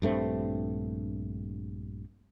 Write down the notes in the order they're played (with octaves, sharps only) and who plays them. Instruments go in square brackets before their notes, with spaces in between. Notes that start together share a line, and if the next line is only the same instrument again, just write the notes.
[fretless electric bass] A#1 G2 A3 C4